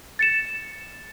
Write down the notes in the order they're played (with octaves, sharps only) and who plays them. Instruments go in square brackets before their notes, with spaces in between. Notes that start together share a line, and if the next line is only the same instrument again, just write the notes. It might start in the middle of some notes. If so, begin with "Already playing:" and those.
[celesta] A6 C#7 E7